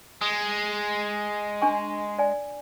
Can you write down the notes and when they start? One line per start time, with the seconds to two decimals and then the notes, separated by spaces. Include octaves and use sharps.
0.21 G#3 D#6
1.62 D4 G#5 C#6
2.19 D5 G#5